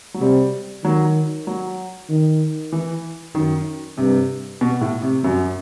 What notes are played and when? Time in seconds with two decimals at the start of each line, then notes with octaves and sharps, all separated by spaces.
0.14 F#3
0.21 C3 G3
0.84 D#3 F#3
1.47 F#3
2.09 D#3
2.72 E3
3.35 F#2 D#3
3.98 G2 C3
4.61 B2
4.81 A2
5.02 C3
5.24 F#2 F#3